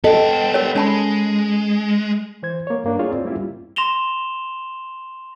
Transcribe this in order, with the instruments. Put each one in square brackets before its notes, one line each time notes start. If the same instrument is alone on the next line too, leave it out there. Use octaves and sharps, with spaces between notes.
[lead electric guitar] B3 G5 [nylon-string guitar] A4 [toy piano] D#5
[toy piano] A#4 C#5
[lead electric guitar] G#3 [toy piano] C#4 A5 B5
[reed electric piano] E3 C5 G#6
A#3 C#5
G2 A#3 D4
E4 F4 G#4 C#5 D5
C4
G3 A#3 C#4 E4 F4 G4
[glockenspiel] C6 A#6 E7 F7 G7